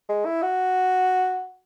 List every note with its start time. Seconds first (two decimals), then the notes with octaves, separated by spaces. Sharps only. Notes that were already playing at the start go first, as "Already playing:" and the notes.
0.09 G#3
0.25 E4
0.42 F#4